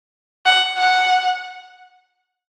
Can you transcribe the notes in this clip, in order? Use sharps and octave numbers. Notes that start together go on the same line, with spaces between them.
F#5
F#5